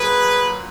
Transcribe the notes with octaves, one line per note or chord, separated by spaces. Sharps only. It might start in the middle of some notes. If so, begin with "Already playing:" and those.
Already playing: A#2 F#3 G#4 B4